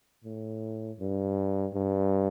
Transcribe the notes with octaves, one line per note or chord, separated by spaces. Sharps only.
A2
G2
G2